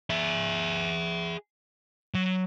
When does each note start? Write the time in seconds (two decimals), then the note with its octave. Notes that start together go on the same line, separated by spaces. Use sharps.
0.10 G#4 E5
2.14 F#3